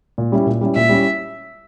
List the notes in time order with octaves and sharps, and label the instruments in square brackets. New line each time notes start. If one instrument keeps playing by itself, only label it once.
[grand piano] A#2
G3 C#4 E4
A#2
G3 C#4 E4
[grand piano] A#2 [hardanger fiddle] E5
[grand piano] G3 C#4 E4